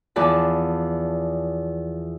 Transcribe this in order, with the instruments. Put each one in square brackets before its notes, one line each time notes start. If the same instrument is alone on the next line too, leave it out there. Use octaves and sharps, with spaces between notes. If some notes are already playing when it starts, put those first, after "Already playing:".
[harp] E2 F3 D5 A5 B5